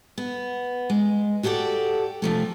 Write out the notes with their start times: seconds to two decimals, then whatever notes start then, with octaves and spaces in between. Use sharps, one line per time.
0.18 B3
0.90 G#3
1.43 F#4 G4 A4 C5 D5
2.22 C3 F3 A3